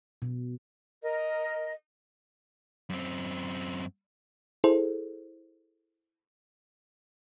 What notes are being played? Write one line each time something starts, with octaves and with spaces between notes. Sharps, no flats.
B2
A#4 D#5
F#2 C4
E4 G#4 A4 C5